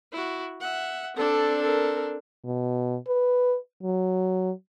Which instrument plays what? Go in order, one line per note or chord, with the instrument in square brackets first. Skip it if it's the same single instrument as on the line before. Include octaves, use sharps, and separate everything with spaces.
[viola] E4 F#4
E5 F#5
[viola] C4 D4 [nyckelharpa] A4 D5
[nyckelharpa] A4 A#4
[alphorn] B2
B4
F#3